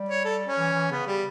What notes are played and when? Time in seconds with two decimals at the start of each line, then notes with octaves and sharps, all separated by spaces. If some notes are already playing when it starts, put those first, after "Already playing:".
Already playing: G3
0.09 C#5
0.24 A4
0.47 C#4
0.58 E3
0.74 E3
0.91 C#3 B3
1.07 G3